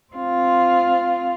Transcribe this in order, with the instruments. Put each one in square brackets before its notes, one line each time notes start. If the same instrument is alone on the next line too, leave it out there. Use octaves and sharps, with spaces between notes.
[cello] C4 F4